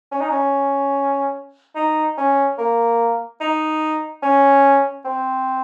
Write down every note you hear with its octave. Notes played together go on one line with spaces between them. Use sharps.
C#4
D#4
C#4
D#4
C#4
A#3
D#4
C#4
C4